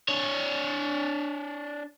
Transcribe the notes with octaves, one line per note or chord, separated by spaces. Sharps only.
D4 C#5